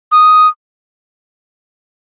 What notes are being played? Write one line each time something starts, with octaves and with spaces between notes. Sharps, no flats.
D#6